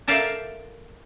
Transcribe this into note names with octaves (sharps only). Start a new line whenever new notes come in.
A4 A#4 D5 E5 F5 G5